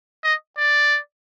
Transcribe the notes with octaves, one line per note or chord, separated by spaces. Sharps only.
D#5
D5